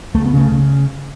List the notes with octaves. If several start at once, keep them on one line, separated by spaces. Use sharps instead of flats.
C#2 A3
B3
C#3 A3
C#3